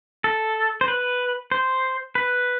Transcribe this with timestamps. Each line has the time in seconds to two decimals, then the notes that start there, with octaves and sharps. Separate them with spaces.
0.24 A4
0.81 C5
0.88 B4
1.52 C5
2.15 B4